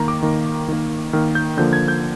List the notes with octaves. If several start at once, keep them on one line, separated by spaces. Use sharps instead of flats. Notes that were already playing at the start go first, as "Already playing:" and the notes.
Already playing: D#3 A#3 A#5
D6
D#3 A#3
D#3 A#3
D#3 A#3 F6
G6
D3 F3 A#3 G6
G#6
G6